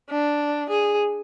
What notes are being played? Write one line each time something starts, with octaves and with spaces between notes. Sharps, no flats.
D4
G#4